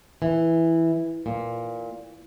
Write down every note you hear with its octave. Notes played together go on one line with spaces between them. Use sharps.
E3
A#2